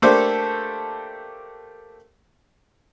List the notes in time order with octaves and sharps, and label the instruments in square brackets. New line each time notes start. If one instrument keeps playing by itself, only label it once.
[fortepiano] A3 A#3 D4 G4 A4 C5